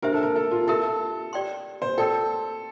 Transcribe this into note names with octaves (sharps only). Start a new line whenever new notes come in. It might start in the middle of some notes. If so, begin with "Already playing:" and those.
D4 G4 A#4 C5 E5
A4
A#4
A4
F4
E4 G4 A4 A#4 E5
G4 D5 G5 C6
C5
A4 A#4 D5 G5